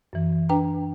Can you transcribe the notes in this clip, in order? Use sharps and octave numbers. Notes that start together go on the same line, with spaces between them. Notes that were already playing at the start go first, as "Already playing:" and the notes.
F#2 E3
D4 B4 G5 A#5